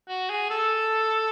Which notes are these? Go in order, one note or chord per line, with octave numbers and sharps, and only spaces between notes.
F#4
G#4
A4